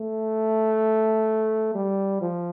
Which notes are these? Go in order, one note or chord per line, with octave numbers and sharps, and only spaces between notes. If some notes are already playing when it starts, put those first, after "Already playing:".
Already playing: A3
G3
F3